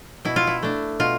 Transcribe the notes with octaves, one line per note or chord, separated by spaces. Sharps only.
B2 E4
F4
E4
A3 D4
B2 F4